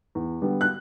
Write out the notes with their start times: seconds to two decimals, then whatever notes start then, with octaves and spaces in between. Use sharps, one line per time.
0.15 E2
0.42 D3 G3 B3
0.61 F#6